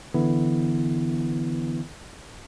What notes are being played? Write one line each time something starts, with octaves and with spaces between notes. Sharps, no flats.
D3 E3 B3 E4